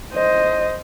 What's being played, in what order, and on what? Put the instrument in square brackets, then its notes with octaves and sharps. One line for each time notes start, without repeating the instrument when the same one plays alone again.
[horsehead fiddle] C5 D#5